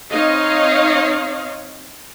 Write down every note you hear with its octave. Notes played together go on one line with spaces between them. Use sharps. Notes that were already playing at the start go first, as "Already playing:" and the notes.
C4 D#4 C#5 D#5 F5